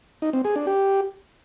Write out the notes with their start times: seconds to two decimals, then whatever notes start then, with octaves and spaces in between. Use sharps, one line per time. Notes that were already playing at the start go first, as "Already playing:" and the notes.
0.22 D#4
0.33 C4
0.44 G#4
0.56 D4
0.67 G4